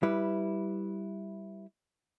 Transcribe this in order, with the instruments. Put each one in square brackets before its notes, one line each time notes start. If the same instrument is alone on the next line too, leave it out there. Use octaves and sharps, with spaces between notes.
[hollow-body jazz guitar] G3 E4 B4